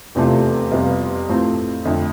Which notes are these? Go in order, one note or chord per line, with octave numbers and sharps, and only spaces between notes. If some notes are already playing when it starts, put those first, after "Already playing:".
F1 E2 C3 F3 A3
F2 C3 G3 B3 F4
A2 F3 A3 C4
F2 D3 A3